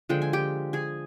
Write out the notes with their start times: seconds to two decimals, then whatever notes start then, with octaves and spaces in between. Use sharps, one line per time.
0.09 D3 F3 G#3 G5
0.22 G#5
0.33 G4 G5
0.73 G#4 G#5